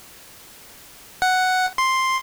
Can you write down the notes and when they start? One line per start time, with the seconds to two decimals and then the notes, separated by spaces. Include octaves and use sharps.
1.22 F#5
1.78 C6